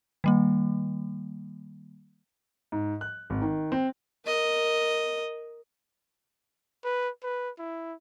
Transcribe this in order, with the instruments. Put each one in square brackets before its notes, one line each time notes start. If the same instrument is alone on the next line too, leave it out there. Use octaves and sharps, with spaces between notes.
[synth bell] D#3 G3 A#3
[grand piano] G#2
F#6
G#1
D#3
C4
[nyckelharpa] A#4 D#5
[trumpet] B4
B4
E4